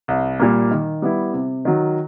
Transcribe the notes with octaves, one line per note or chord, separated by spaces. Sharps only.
C2
A#2 G3 A#3
D#3
G3 B3 E4
C3
D#3 F#3